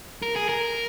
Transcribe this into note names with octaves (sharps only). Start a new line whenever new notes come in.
A#4
G#4
A#4